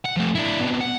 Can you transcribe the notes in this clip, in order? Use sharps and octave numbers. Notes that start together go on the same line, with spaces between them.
F#5
F3 A3
D4 E4
C3 B3
F#5